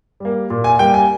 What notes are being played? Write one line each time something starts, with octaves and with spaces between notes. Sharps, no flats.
G3 A#3
A#2
G#5
G3 A#3 G5
G#5